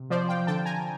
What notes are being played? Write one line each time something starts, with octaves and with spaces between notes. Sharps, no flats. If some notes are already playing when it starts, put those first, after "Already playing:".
Already playing: C3
F3 C5 D5
F5 G5
D3 G5 A5
G#5 A#5